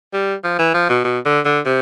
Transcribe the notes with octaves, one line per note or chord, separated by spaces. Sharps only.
G3
F3
E3
F3
B2
B2
D3
D3
C3